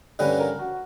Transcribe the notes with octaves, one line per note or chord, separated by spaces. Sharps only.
G2 D3 G3 A#3 C#4 B4
A#4
F#4